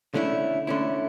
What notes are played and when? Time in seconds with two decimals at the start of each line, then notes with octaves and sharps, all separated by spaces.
0.14 D3 A3 C#4 E4
0.67 D3 A3 C#4 E4